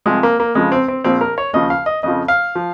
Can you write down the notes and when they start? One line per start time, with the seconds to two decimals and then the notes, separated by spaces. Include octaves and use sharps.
0.06 C2 C3 F3 G#3
0.23 A#3
0.40 A#3
0.55 F2 C#3 F3 G#3
0.72 C4
0.88 C4
1.04 A#1 A#2 F3 C4
1.21 A#4
1.38 C#5
1.53 D#2 C#3 F3 D#5
1.70 F5
1.86 D#5
2.03 F2 C#3 F3 D#5
2.28 F5
2.55 F3